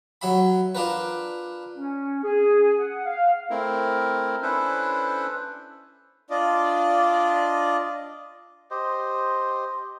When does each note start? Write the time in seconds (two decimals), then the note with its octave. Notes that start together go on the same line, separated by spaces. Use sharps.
0.21 F#3 E5 B5
0.75 D4 F4 A#4 B4
1.75 C#4
2.23 G#4
2.79 F#5
3.05 F5
3.50 A3 C4 E4 A#4
4.42 C#4 D4 E4 A4 B4 C5
6.30 D4 F4 D5 D#5
8.71 G4 C5 D#5